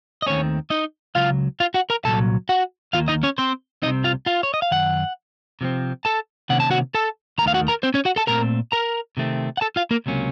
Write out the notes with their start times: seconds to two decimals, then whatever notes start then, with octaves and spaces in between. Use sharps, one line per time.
0.22 D#5
0.26 D#2 D#3 A3 C4 C#4 C#5
0.70 D#4 D#5
1.15 C#2 C#3 F#3 F4 F5
1.60 F4 F5
1.74 F#4 F#5
1.90 A#4 A#5
2.05 C2 A#2 F#3 A4 A5
2.49 F#4 F#5
2.93 D#2 D#3 A#3 F4 F5
3.08 D#4 D#5
3.23 C#4 C#5
3.38 C4 C5
3.82 C2 C3 F#3 C4 D#4 D#5
4.04 F4 F5
4.26 F4 F5
4.43 C#5
4.54 D#5
4.62 F5
4.71 F#2 D#3 F#5
5.61 C3 F3 C4
6.05 A4 A5
6.49 C3 D#3 A#3 C#4 F#5
6.60 A5
6.71 F#4 F#5
6.95 A4 A5
7.38 D#2 D#3 A3 A#4 A#5
7.47 F5
7.54 F#4 F#5
7.68 A#4 A#5
7.83 C4 C5
7.94 C#4 C#5
8.05 F#4 F#5
8.16 A4 A5
8.27 A#2 A3 C4 A#4 A#5
8.72 A#4 A#5
9.17 C3 D#3 A3 C4
9.57 F#5
9.61 A4 A5
9.76 F4 F5
9.91 A#3 A#4
10.06 C#2 C3 F#3 A#3 C#4